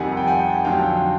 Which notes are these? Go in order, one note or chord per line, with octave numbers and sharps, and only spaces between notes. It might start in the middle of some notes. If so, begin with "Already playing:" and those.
Already playing: F2 C3 D#3 G3 F#5 G#5
G5
F#5 G#5
F2 D3 F#3 F5 G5